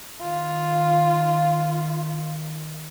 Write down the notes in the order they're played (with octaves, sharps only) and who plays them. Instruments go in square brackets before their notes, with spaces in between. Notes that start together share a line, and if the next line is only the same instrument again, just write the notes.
[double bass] D#3 [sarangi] F4